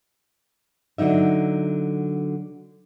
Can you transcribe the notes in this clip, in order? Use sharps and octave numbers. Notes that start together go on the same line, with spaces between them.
D3 F#3 D#4 E5